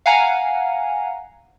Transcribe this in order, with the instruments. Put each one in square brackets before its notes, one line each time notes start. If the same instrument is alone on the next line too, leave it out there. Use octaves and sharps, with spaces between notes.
[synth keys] F5 F#5 G#5 A#5